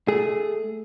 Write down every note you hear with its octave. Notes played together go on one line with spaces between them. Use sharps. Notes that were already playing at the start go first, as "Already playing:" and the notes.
A3 G#4